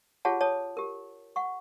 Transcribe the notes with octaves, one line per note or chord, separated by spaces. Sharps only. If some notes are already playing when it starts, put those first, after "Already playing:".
F4 G4 G#4 C#5 F#5 A5
C#5 A5 D#6
G4 A#4
F#5 C#6